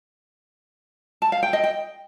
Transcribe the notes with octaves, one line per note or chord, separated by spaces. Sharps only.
A5
F5
G5
D#5
G5